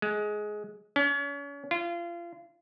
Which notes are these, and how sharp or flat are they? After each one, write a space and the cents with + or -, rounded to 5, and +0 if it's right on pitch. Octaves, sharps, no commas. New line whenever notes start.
G#3 +15
C#4 +35
F4 -30